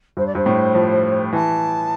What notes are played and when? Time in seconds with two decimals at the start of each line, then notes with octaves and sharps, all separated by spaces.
0.17 G2 C5
0.26 D5
0.35 G2 C5
0.46 A2
0.75 F3
1.33 E3 A5